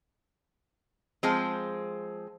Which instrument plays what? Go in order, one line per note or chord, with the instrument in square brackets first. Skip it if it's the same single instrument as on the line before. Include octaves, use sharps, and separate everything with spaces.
[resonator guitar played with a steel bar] F3 G#3 C4